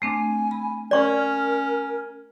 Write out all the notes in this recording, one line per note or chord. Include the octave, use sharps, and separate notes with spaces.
A3 C4 D4 G#5
B5
C#4 A#4 D5 C#6